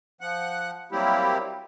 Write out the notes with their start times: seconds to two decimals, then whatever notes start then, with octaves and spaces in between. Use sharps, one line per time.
0.21 F3 F#5 F#6
0.92 F#3 G3 A#3 C4 E4 G4